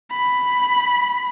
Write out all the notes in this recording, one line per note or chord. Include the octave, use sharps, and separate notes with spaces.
B5